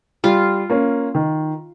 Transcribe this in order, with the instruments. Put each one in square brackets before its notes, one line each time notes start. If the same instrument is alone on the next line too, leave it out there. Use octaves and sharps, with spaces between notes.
[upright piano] G3 [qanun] F4
[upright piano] A#3 C#4
D#3